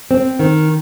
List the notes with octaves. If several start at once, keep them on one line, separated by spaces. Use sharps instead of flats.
C4
D#3